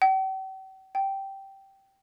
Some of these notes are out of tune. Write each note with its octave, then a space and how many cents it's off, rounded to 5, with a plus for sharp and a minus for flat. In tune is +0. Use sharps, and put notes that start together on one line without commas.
G5 -45
G5 -10